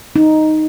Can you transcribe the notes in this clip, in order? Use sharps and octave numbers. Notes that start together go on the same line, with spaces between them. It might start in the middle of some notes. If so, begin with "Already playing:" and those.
D#4